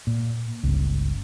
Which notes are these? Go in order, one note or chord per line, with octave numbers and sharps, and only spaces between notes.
A#2
G1 C#2